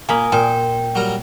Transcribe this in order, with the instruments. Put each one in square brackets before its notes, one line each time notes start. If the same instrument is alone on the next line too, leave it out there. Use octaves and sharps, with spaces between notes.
[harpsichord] A#2 [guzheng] A#3 B5 [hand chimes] G#5 D#6
[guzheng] A#2 [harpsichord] C5 [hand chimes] G5
[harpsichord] F#3 G3 A#4